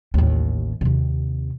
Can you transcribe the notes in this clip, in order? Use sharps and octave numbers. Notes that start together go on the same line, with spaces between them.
A1 D#2
D#2 C3